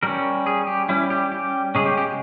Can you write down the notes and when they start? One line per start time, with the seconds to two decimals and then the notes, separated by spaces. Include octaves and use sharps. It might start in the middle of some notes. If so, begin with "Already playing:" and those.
0.03 G3 C#4 A#4
0.46 G#4
0.67 G4
0.89 G3 C#4 E4
1.10 G4
1.32 G4
1.75 C#3 G#3 C#4 G#4
1.86 G4
1.97 G4